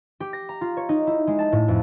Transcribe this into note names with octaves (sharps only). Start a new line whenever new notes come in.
G4
A#6
A#5
F4
C#5
D#4
E4
G#3
A5
A2
F2